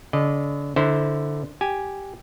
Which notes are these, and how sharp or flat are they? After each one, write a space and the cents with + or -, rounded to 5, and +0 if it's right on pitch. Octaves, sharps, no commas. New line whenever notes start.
D3 -40 D#5 -30
D3 +0 E4 -25 C5 +0
G4 +0 G#5 +0